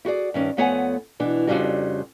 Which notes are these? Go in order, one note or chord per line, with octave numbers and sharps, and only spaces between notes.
E4 F#4 G#4 D5
G2 D#3 C#4
F2 A3 B3 C#5 F#5 G#5
B2 E3 D4
F2 G#2 C#3 G3 D4 F#4